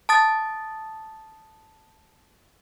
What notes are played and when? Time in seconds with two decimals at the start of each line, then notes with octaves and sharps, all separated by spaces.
0.09 A5 D#6 A6